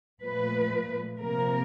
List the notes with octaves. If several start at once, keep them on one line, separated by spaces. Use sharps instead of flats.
A#2 F3 A3 B4
C3 F3 A#3 A#4